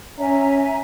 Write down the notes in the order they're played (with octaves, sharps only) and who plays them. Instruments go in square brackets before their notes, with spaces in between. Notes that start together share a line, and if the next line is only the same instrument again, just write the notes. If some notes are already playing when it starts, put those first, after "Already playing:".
[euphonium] C#4 [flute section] E5 G#5 A#5